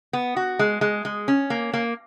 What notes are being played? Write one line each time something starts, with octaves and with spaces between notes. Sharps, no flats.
B3
F#4
G#3
G#3
G#3
C#4
A#3
A#3